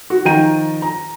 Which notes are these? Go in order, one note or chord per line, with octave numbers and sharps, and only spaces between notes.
F#4
D#3 F3 G5 A#5 D#7
A#5